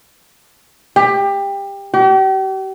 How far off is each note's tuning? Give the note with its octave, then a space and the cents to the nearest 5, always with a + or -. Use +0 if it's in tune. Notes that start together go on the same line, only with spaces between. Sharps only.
G4 +20
G4 -40